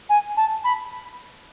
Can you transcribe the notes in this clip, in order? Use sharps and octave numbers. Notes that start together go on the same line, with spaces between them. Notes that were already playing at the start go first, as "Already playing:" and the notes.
G#5
A5
B5